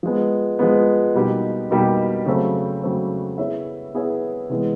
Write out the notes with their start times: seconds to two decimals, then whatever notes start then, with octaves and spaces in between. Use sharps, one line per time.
0.03 F3 G#3 B3
0.59 F3 G#3 B3
1.15 B2 G3 A#3 D#4 G4
1.71 B2 G3 A#3 D#4 G4
2.26 C#3 F#3 A3 C4
2.83 C#3 F#3 A3 C4
3.38 B3 E4 G#4 C#5 E5
3.94 B3 E4 G#4 C#5 E5
4.50 C3 E3 G#3 B3